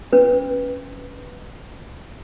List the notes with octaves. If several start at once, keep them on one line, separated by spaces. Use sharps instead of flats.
C#4 B4